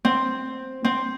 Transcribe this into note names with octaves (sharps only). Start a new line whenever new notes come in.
C4
C4